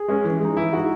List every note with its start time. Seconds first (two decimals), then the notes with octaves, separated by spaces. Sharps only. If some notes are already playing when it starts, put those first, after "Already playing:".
Already playing: G#4
0.08 G#3 C#4
0.25 E3
0.40 G#3 D#4
0.57 E3 E4
0.72 G#3 D#4 F#4